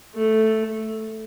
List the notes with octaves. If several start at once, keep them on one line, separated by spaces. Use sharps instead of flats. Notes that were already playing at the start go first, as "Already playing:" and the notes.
A3